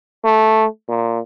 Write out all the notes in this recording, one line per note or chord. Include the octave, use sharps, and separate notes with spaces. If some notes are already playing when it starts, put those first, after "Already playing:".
A3
A#2